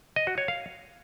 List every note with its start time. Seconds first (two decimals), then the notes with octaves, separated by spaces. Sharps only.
0.16 D#5
0.27 F#4
0.38 C#5
0.48 F5